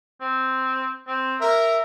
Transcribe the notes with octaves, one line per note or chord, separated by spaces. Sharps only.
C4
C4
A#4 E5